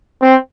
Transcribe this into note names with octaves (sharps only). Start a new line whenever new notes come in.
C4